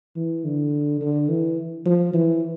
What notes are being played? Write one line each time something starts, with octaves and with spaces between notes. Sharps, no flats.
E3
D3
D3
E3
F3
E3